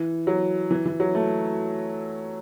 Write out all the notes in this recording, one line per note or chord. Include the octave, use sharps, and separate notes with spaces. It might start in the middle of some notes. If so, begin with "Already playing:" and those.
Already playing: E3
F#3
E3
E3
F#3
A3